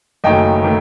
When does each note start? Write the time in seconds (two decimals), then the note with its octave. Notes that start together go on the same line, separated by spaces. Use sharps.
0.24 F#1 F#2 D#3 A3 D#5 G5
0.64 D#3 A3